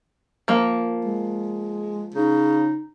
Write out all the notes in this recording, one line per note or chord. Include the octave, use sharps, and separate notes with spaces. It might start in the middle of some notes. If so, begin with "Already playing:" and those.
F3 A#3
G#3
C#3 D#4